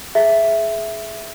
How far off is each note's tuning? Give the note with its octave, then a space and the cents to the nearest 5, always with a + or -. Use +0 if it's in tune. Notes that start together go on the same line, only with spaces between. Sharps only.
G#4 +20 E5 +5